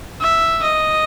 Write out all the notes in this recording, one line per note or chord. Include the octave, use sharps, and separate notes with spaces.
E5
D#5